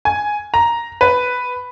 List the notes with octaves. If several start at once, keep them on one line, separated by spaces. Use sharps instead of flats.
G#5
A#5
B4